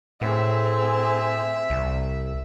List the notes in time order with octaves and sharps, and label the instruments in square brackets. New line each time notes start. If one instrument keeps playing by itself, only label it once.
[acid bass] A2 [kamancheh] C4 G#4 [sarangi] E5
[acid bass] C2